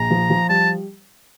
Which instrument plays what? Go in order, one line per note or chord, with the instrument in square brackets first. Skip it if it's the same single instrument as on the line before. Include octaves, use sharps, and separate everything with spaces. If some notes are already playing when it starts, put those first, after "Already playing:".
Already playing: [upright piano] A#1 [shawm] A#5
[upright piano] F3
F3
[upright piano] G3 [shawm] A5